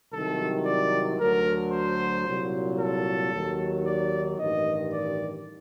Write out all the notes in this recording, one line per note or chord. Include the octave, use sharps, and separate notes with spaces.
C2 C3 D#3 F#3 A4
D5
D2 D3 F#3 A#4
C5
C2 A#2 F#3
A4
D#2 D#3 F#3
D5
A1 G2 D#3 D#5
D5